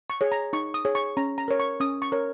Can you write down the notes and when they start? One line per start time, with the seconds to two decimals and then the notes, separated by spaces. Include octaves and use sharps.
0.10 C#6
0.21 G#4 C#5
0.32 A#5
0.53 D#4 C#6
0.74 D#6
0.85 G#4 C#5
0.95 C#6
1.17 C#4 A#5
1.38 A#5
1.48 A#4 C#5
1.60 C#6
1.80 C#4 D#6
2.02 C#6
2.12 A#4 C#5